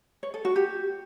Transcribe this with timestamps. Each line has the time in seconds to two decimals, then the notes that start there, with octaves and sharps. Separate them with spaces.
0.23 C#5
0.34 A4
0.45 F#4
0.56 G4